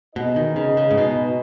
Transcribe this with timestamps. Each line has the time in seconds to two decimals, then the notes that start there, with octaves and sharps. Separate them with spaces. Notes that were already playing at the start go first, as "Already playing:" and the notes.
0.15 B2 G#3 D#4 B4 D#5
0.36 D#3
0.56 C#3
0.77 C#3
0.91 G#2
0.97 B2